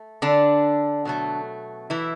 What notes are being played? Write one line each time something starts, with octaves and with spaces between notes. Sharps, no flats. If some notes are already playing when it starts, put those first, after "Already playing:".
Already playing: A3
D3 D4
B2 F#3 A3
E3 E4